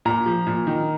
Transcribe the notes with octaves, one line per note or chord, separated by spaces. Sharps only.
A#2 A#5
F3
A#2
D#3